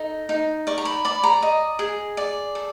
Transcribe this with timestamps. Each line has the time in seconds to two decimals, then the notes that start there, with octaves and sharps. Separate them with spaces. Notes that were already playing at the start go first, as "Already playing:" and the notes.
Already playing: D#4 A4
0.29 D#4
0.67 D5 C#6
0.78 A#5
0.85 B5
1.05 D5 B5
1.23 A#5
1.42 D#5
1.79 G#4
2.17 D5
2.55 A4